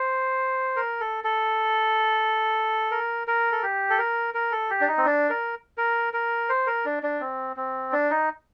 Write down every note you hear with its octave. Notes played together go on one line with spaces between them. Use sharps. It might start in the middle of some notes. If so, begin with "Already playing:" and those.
Already playing: C5
A#4
A4
A4
A#4
A#4
A4
G4
A4
A#4
A#4
A4
G4
D4
D#4
C4
D4
A#4
A#4
A#4
C5
A#4
D4
D4
C4
C4
D4
D#4